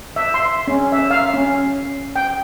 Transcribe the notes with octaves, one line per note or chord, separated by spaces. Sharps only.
E5
C6
C#4
E5
F5
C#4
G5